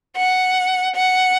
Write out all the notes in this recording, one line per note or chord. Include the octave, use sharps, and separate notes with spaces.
F#5
F#5